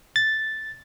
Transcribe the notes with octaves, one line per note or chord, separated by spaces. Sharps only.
A6